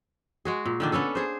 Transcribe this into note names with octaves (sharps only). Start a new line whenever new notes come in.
G#3 F#4 G#4
A#2
D3 D#3 D4
B3 C#4 D4 A4
G#4 C5